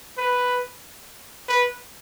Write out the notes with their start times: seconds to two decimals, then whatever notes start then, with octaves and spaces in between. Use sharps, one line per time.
0.17 B4
1.48 B4